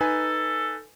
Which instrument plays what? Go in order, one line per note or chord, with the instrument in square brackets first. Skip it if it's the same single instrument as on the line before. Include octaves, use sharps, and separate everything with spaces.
[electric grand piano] D#4 B4 G#5 [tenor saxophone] A4